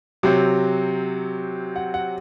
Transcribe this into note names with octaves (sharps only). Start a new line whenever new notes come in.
C3 F#3 C4
F#5
F#5